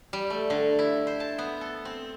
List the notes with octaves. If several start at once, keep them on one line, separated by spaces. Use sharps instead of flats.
G3
A3
D3
E4
C5
A5
B3
A4
C4